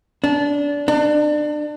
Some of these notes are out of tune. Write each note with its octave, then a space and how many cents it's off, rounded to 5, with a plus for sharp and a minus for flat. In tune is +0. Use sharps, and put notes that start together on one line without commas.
D4 -25
D4 +30